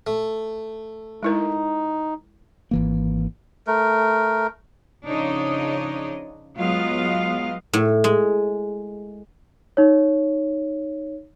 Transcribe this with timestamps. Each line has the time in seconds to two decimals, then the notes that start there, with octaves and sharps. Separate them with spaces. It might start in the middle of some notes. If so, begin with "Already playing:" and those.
0.07 A3
1.23 G#3 D#4 E4 A#4
2.71 G#1 E3 A#3
3.67 A3 A#4
5.06 C#3 F3 D4 D#4 C#5 D#5
6.56 F#3 G#3 B3 F4 D#5 F5
7.73 A2
8.04 G#3
9.77 D#4 C#5